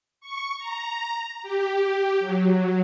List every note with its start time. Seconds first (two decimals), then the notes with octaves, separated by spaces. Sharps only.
0.21 C#6
0.58 A#5
1.43 G4
2.20 F#3